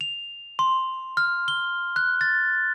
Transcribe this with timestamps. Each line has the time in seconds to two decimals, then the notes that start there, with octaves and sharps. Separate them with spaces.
0.01 F7
0.59 C6
1.17 F6
1.48 G7
1.96 F#6
2.21 A6